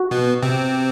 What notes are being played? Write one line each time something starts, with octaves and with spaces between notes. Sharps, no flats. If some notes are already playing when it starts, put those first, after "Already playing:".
Already playing: F#4
B2 B3
C3 C4